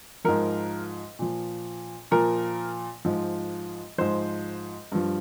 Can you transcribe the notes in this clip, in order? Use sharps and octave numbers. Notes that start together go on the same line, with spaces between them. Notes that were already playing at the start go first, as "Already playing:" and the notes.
G#2 F3 A#4
A#2 F3
A#2 F3 A#4
G#2 F3
G#2 F3 C5
G2 F3